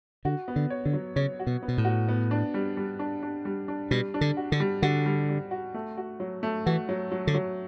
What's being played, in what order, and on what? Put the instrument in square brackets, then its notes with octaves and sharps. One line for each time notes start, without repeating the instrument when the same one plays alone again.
[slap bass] D3 [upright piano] F#4
[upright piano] B3
[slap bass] D3
[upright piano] C#5
[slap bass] D3
[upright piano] F#3
[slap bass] C#3 [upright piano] C#5
[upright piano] F#4
[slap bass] B2
[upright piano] B3
[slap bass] B2
A2
[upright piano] F#4
B3
D4
G3
G3
D4
D4
G3
D4
[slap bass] B2 [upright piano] G3
[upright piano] D4
[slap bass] D3
[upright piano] F#4
[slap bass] D3
[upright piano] G3
[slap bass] D3 [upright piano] F#4
[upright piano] G3
G3
F#4
A3
F#4
F#3
A3
[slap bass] E3 [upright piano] F#4
[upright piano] F#3
F#3
[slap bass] D3
[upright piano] F#3